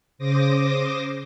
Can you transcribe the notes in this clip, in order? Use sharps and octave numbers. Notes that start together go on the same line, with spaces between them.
C#3 C5 D6 D#6 A#6